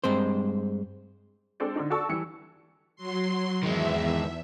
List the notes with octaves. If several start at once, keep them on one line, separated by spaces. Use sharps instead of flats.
G2 G#3 C4 C5
G#3 C4 D4 A4 C5 D5
D3 D4 D#4
F#4 A4 D5 A5 C#6 E6
E3 G3 C#7
F#3 C6
E2 D#3 G#3 E5